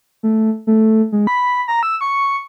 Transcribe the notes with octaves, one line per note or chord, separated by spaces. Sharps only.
A3
A3
G#3
B5
A#5
E6
C#6